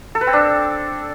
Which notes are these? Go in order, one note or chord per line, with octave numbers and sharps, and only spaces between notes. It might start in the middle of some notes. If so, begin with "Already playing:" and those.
A4
B4
C4
D4